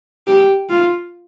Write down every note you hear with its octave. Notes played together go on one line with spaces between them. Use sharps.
G4
F4